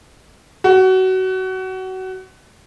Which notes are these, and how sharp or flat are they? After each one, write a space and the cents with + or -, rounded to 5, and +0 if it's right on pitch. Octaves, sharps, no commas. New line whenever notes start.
F#4 +25